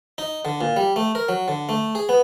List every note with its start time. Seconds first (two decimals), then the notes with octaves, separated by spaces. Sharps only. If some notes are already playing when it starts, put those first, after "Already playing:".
0.18 D#4
0.45 D3
0.61 A#2
0.77 G3
0.96 A3
1.15 A#4
1.29 F#3
1.48 D3
1.69 A3
1.95 G#4
2.09 B3